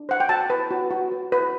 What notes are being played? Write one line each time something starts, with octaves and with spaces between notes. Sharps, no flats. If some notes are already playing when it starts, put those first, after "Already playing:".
Already playing: D4
C5 F#5
G5
F#4 A5
B4
F#4
F#4
B4
B4